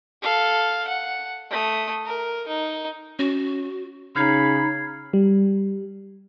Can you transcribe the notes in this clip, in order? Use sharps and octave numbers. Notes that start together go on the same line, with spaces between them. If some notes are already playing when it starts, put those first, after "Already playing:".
A4 F5
F#5
A3 D#6
A#4
D#4
C#4 F#4
C#3 D#4 B5 F6 G#6 C7
G3